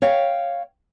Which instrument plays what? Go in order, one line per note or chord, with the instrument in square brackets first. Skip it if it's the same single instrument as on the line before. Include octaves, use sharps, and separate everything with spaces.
[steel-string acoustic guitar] C#5 F5 G5